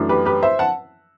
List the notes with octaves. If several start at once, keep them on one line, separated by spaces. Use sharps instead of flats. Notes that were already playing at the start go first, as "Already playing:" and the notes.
Already playing: F#2 E3 A3 D4
G4 B4
G4 B4
C5 E5
F#5 A5